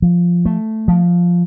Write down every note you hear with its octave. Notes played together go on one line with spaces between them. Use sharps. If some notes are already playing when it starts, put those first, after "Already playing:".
F3
A3
F3